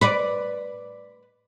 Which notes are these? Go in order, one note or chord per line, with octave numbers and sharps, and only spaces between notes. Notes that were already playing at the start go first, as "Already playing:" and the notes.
B4 D5